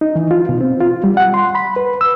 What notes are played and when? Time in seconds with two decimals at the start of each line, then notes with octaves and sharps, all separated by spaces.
0.01 D#4
0.16 E3
0.31 F4
0.49 B2
0.61 C4
0.81 F4
1.04 G3
1.17 F#5
1.34 C6
1.55 B5
1.76 B4
2.01 E6